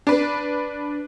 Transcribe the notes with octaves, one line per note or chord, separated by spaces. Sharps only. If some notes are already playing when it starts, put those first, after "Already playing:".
D4 B4